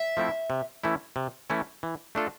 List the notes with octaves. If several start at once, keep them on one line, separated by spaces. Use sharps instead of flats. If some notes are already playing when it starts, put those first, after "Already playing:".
Already playing: E5
F3 A3 C4 E4
C3
E3 A3 C#4 E4
C3
E3 A3 C#4 E4
E3
A3 D4 F4 A4